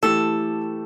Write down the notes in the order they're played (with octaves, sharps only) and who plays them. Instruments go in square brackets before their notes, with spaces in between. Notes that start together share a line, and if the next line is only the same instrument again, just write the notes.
[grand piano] E3 A3 E4 G4 [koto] A4